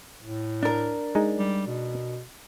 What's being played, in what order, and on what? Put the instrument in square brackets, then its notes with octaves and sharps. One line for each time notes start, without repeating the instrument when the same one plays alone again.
[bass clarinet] A2
[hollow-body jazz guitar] D4 A#4
[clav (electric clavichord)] G#3 D#4
[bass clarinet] G3
B2